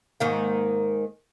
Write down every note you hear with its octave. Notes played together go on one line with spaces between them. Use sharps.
G#2 D#3 A#3